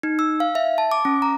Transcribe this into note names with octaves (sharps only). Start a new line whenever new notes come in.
D#4
E6
F5
E5
A5
D6
C#4
A#5